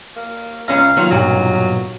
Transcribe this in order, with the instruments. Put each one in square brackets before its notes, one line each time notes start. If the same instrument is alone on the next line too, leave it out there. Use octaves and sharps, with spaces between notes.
[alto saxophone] A#3
[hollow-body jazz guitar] C#2 C#4 A#5 [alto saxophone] F5
[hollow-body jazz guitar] D#3 F#3 F4
[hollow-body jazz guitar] B1 G2 A#2 [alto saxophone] F#3